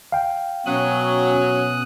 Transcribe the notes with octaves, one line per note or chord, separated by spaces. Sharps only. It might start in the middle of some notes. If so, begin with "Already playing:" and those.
F5 G5
B2 F#3 C#4 D#6 F#6